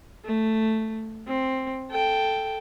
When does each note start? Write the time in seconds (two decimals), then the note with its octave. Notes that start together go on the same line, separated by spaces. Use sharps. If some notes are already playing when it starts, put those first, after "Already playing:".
0.25 A3
1.28 C4
1.91 A4 G5